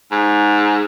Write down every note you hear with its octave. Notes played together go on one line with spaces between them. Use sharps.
G#2